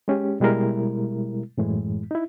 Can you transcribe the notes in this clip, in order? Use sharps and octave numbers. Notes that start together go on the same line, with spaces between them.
G#3 C#4 G4
B2 G3 G#3 E4 A#4
F#2 A2 E3 G#3
D#4 E4